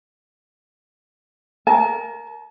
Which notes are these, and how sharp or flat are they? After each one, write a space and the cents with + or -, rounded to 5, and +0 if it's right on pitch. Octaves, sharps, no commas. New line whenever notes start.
A#4 +0 A5 -40